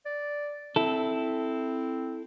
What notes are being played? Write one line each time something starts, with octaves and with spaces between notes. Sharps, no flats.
D5
C4 E4 A4